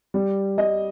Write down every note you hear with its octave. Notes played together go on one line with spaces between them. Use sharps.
G3
G3 D#5